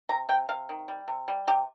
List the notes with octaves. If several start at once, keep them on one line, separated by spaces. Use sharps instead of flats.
C3 A#5
C3 G5
C3 F5
D#3
G3
C3
G3
C3 G4